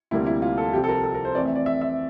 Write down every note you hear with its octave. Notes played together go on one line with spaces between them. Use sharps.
D2 C3 G3 A#3 E4
E4
F4
A4
C2 C3 F3 C4 G4
A4
A#4
A4
A#4
C5
F2 E3 A3 C4 D5
E5
D5
E5
E5